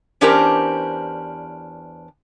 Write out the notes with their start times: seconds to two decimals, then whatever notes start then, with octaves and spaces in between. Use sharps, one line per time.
0.21 E2 C#4 D4 G4 A#4 C5